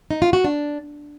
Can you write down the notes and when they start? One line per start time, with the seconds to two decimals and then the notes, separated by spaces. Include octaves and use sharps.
0.11 D#4
0.22 F4
0.33 F#4
0.44 D4